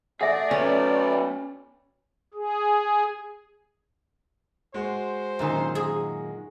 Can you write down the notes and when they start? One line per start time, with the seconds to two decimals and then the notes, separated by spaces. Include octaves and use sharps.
0.21 A3 G#4 D5 E5 F#5
0.51 F#3 B3 C#4
2.34 G#4
4.74 G#3 F#4 C5
5.39 F#2 A#2 D#3
5.75 G#4